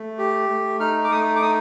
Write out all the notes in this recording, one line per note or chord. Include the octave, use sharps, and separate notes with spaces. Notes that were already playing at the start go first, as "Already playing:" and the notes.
Already playing: A3
G4
A3
D#4 F6
D6
A3 D#6
D6
D#4 D#6